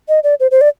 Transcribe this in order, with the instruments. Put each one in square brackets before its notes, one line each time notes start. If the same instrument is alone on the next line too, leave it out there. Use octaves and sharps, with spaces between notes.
[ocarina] D#5
D5
C5
C5
D5